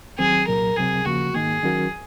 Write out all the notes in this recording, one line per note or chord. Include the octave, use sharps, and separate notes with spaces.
D#2 D#3 F#3 C4 G#4
C2 A#2 F#3 A#4
C#2 C3 F#3 C4 G#4
D#2 C#3 F3 A#3 F#4
G#2 D#3 A#3 G#4
D#3 F#3 C#4 F#4 A#4